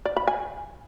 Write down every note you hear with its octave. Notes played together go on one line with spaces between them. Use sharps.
D5
B5
G#5